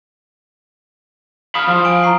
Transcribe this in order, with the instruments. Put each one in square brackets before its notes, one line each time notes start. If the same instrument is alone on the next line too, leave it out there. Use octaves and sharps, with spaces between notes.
[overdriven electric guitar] F5 B5 [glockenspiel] D#6 F6
[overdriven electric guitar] F3
[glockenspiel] G#5 D7
A#5 C#6 C7